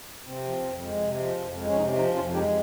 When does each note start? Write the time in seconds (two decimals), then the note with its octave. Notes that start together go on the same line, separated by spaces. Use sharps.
0.25 C3 C4
0.43 F3
0.62 F2
0.81 G#3
1.01 C3
1.19 F3
1.39 F2
1.57 G#3
1.66 C#4
1.76 C3 C4 D#4
1.95 F3 C4 D#4
2.14 F2 C#4 F4
2.33 G#3 D#4 G4